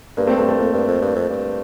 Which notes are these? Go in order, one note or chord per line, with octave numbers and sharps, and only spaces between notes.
G2 A#3
A3 C4
G2 A3
A3
F2 A#3
G2
F2
G2
F2
G2